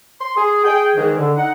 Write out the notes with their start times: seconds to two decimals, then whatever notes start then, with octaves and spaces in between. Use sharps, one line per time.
0.20 C6
0.36 G#4
0.65 G#4 G5
0.95 G#2 D#3 E3 G#4
1.16 D3
1.36 D#4 F#5